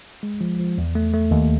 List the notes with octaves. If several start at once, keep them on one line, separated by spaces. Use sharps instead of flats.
G#3
F3
F3
E2
A3
A3
D#2